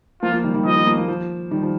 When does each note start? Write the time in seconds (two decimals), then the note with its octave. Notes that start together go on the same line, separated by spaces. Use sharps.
0.22 F3 A#3 F4
0.33 F3 A#3
0.44 D#3 G3
0.54 D#3 G3
0.65 F3 D#5
0.76 F3
0.86 F3 A#3
0.97 F3 A#3
1.08 F3
1.51 D#3 G3
1.63 F3